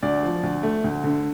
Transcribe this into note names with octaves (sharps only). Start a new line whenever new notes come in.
D2 D5
F3
D2
A3
D2
D3